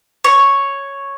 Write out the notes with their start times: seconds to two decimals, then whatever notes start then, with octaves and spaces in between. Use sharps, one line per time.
0.24 C#5